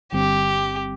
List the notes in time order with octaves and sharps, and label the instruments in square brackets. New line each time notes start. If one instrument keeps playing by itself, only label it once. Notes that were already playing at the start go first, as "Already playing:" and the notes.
[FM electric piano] G1 G2 D3 G3 C4 [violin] G4